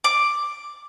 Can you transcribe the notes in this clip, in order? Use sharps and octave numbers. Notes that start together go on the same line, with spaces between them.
D6